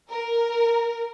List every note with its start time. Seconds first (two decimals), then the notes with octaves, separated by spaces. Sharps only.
0.10 A#4